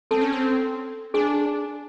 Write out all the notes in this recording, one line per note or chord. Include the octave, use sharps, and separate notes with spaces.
C4 A4 A5
C#4
C4
D4 G#4 G#5